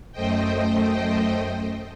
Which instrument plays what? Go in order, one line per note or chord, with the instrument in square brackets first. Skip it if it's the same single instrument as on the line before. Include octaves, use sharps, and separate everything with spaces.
[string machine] F#2 A3 C5 D#5 G5